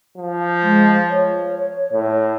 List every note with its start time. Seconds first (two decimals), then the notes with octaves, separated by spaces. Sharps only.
0.18 F3
0.62 G#3
1.10 C#5
1.93 A2